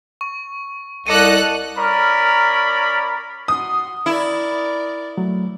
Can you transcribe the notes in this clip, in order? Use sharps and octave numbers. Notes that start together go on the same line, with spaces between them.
C#6
C2 A4 D#5 D6 F#6 C#7 D#7
C#4 A#4 D5 B5
F#4 C6 D#6
E4 A#4 D5
F#3 A3